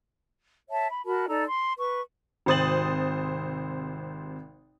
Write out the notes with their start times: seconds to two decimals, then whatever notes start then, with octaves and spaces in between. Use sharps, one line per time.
0.70 C#5 E5 A5
0.89 B5
1.05 F#4 A#4 A5 B5
1.28 D#4 A4 D5 A#5
1.46 C6
1.79 B4 C#6
2.46 G#1 C3 C5 D#6 A6 F#7